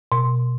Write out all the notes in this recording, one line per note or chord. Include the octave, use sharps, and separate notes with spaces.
B2